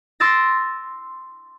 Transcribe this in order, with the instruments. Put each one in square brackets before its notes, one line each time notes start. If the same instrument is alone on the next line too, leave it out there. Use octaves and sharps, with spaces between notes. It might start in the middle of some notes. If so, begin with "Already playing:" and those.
[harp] C6 D6 E6 A6 A#6